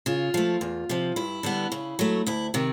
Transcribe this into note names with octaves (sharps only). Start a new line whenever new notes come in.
C#3 F4
F3 A3
E2
C3 F3
G2 E4
D3 G3 B3
C#3
F#3 A3
D2 E4
C3 D#3